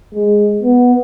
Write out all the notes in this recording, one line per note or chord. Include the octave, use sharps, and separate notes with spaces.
G#3
B3